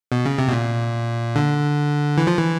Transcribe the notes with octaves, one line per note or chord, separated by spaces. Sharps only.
B2
C#3
C3
B2
A#2
D3
E3
F3
E3